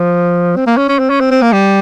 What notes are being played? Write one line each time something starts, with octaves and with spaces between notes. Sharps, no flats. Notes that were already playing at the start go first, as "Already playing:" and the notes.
Already playing: F3
C4
A#3
C#4
C#4
C4
C#4
C4
C4
A#3
G3